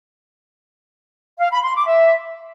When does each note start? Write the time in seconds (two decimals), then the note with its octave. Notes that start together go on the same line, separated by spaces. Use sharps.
1.39 F5
1.51 B5
1.62 C6
1.74 D6
1.86 E5